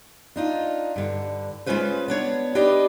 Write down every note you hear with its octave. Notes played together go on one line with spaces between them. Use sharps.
D4 D#4 F4
G2 D3
G#3 B3 C#4 F4 B4 C5
B3 D4 C#5
D4 G4 B4 D5 D#5